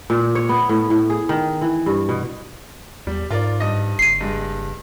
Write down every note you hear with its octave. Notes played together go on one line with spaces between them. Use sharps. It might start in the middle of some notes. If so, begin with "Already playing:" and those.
A#2
C#5
B3
A2
A2
G#4
D#3
E3
G2
B2
E2 G3
G#2 F4 A#4 D5
G2 D#5
F#1 C7 D#7
G2 G#3